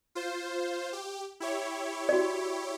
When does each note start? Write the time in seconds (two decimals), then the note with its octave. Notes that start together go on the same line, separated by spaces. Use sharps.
0.15 F4 C5
0.93 G4
1.40 E4 G4 C#5
2.09 F#4 D5